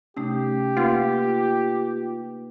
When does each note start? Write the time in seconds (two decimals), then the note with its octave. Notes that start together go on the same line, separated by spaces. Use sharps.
0.17 C3 A3 C#4 D#4 G4
0.77 A#3 D#4 F4 B4 F#5